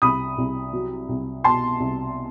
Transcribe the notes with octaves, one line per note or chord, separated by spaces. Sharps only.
C2 B5 D#6
C2
F#3
C2
B2 A5 C6
C2